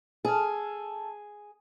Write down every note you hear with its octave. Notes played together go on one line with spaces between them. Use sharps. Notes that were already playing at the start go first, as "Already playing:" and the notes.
G#4 A4 F6